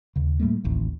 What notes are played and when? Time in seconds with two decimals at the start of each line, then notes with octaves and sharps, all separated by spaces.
0.16 D#2 C#3
0.40 A2 G3 A3 A#3
0.64 D1 A1 D#2